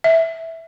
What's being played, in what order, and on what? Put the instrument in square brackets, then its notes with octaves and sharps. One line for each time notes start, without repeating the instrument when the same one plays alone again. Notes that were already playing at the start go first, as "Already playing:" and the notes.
[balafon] E5